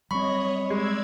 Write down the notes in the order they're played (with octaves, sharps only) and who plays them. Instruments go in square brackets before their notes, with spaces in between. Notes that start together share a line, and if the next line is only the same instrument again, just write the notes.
[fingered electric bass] F#3 G3 C4 [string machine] C#5 D#5 [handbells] B5 C#6
[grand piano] G#3 [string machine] D5 E6 G#6